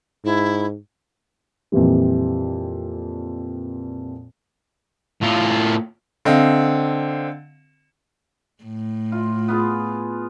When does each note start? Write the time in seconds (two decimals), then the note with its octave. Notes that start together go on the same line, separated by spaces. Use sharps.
0.24 G#2 E4
1.72 F2 A#2 E3 G3
5.22 A2 F4
6.25 D3 C4 D#5 F5
8.64 A2
9.12 F4
9.48 B3 F4 G#4